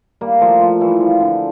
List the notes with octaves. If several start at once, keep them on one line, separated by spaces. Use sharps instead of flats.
G3 A#3
F3 A3
F3
E3 G3
F3
D3